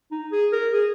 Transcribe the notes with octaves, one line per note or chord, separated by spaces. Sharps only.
D#4
G#4
A#4
G#4